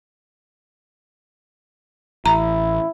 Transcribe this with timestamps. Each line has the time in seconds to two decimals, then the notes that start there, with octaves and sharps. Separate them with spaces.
2.26 A1 E4 A#5